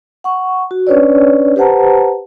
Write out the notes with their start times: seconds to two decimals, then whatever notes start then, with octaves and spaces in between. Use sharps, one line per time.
0.24 F#5 C#6
0.71 F#4
0.87 C#4 D4 B4 C#5 D5
1.56 G4 B4 C5 F#5 A5 A#5